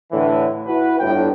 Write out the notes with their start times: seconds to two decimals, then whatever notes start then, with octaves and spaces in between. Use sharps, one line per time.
0.12 A2 D3 E3
0.67 E4 F#4 B4
0.99 G1 A2 G5